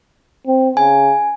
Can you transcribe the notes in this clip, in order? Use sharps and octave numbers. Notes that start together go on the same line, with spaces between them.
C4
C#3 G#5